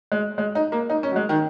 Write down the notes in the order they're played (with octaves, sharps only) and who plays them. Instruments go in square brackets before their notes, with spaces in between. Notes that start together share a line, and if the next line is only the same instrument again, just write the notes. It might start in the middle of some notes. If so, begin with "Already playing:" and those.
[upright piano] G#3
G#3
D#4
A#3
D#4
C#4
F#3
G#3
D#3